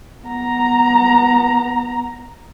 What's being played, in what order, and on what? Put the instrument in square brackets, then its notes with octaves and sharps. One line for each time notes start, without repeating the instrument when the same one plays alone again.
[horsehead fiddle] B3 A#5